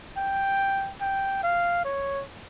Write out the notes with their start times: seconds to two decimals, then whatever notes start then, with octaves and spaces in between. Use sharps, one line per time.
0.17 G5
1.01 G5
1.43 F5
1.85 C#5